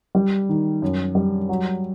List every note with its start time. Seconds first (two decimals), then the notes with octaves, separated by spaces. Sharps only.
0.15 G3
0.49 D#3
0.82 F#2
1.15 G3
1.49 F#3